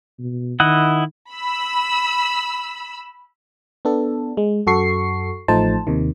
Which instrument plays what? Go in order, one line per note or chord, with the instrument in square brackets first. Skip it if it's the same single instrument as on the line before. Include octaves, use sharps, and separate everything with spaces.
[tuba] B2
[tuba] D#3 [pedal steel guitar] E4 D#5 F#5
[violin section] B5 E6
[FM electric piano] B3 D4 A4
G#3
F#2 F#4 A4 C#6 C7
A1 F3 A3 D#4 C5 A5
D#2 C3 D#3